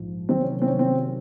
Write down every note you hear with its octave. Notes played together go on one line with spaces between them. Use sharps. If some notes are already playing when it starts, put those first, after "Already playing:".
Already playing: A#1 G#2 F3
C3 D#3 F#3 C4
C#4
C4
C#4
C4